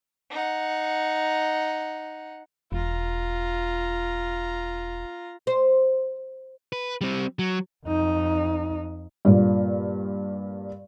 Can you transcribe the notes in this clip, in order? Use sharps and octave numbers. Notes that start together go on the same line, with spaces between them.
D#4 F#5
E1 F4 A#5
C5
B4
G3 C4
F#3
F2 D#4
G2 A#2